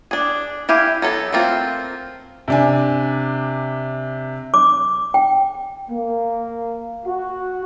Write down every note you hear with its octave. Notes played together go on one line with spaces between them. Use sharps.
D4 G#4
E4 G4 F5 G#5
F#3 B3 A4
A3 A#3 C4 F4
C3 D4 G#5
D6
G5
A#3
F#4